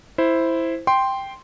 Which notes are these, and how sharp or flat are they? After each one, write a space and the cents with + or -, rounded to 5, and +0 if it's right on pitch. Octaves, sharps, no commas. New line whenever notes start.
E4 +0 C5 +0
G5 +0 C6 +0